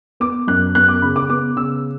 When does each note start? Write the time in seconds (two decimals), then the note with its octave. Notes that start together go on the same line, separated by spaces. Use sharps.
0.20 B3 D6
0.48 F#2 F#6
0.75 B3 F#6
0.88 D6
1.02 C#3 B5
1.16 D6
1.30 B3 D6
1.56 C#3 E6